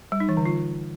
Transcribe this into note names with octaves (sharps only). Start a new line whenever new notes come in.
G3
D#4
E3
D3
F4